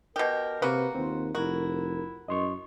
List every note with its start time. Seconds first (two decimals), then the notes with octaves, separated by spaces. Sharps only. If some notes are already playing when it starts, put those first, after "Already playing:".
0.16 B2 G4 A#4
0.62 C3 A#3 F#4 B4
0.95 D#2 C4 F4
1.35 F1 E4 F#4 A#4
2.28 F#2 D#5 C6 C#6